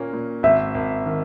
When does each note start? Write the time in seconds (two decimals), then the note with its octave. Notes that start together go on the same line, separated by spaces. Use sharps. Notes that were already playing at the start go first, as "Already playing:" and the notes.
Already playing: A#2 A#3 C#4
0.13 A#2
0.43 G#1 E5
0.74 G#1
1.06 D#3